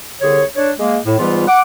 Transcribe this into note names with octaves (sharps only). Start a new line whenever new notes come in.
C2 D3 G#4 C#5
D4 C#5
G#3 A#3
A2
G#2 E3 G3 B3 F4
F#5 D6